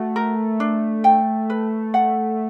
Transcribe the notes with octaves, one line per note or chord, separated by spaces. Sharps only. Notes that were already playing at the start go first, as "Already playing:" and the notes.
Already playing: A3 F#4
A#4
D4
G5
B4
F#5